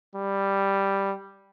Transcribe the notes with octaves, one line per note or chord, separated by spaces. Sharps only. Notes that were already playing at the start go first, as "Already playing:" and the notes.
G3